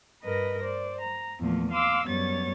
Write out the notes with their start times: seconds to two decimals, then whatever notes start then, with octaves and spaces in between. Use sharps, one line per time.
0.23 G2 A#4 B4 D#5 A#6
0.63 C5 D5
1.00 A#5
1.40 E2 A#2 F3 A3
1.71 F5 C6 D6 E6
2.06 F#2 G3 B3 C#5 A6